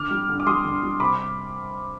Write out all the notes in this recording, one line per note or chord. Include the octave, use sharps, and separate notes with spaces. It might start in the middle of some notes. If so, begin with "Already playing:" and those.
Already playing: D3 D6 F6
G3
D3
D6
G3 C6 D#6
D3
G3
C3 B5 D6